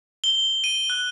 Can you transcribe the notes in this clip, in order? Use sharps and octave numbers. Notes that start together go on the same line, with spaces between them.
G7
D#7
F#6